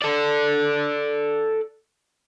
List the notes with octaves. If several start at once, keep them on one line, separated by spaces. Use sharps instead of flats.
A4 D5